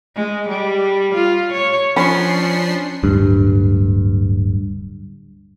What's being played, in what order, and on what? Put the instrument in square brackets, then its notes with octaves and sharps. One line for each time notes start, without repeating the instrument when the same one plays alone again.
[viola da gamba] G#3
G3
F4
C#5
[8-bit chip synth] F3 D4 C7 [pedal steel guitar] C#4 [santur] B5
[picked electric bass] D1 G2